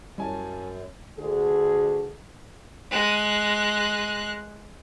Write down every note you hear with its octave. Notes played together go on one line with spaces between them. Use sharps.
F#2 G3 C#4 E4 D#5 G#5 A5
D2 D3 G#4
G#3 F#6